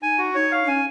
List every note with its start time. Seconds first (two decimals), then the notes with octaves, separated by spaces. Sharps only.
0.02 D#4 G#5
0.18 F#4
0.34 D#4 C#5
0.52 F5
0.63 D#4
0.68 C#4 G#5